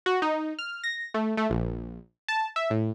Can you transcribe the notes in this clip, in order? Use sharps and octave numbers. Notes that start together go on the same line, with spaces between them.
F#4
D#4
F6
A#6
A3
A3
A#1
A5
E5
A2